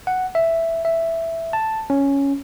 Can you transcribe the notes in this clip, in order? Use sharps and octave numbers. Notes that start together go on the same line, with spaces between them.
F#5
E5
E5
A5
C#4